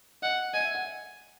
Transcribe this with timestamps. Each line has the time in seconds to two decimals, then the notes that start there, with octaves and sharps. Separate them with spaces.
0.22 D#5 F#5
0.54 D#5 G#5
0.65 E5
0.75 F#5